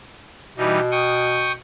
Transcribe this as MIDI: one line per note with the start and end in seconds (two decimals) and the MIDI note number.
0.57 1.60 47
0.57 0.80 52
0.57 0.80 55
0.57 0.80 63
0.91 1.52 79
0.91 1.52 85
0.91 1.52 87